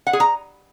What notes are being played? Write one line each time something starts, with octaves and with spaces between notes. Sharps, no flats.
F#5
G#4
A#5